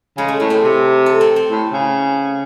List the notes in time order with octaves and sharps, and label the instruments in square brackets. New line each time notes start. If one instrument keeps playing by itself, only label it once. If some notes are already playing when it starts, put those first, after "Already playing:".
[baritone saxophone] C#3 [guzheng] G#3
[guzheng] A3
[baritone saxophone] A2 [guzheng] A3
[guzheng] C4
[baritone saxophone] C3
[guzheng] A4
C4
C4
[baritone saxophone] A2
C#3